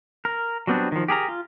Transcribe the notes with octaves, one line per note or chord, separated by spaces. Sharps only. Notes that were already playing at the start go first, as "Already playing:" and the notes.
A#4
F#3 G3 B3 C4 D4
D#3 F3
G4 G#4 A#4 A#5
F4